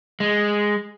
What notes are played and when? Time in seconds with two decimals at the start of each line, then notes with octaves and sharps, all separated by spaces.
0.20 G#3